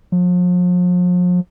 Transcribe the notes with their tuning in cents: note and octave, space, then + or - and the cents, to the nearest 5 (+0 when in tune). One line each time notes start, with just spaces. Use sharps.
F3 +40